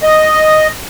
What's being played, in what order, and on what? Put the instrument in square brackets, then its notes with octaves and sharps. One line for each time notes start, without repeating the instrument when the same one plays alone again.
[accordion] D#5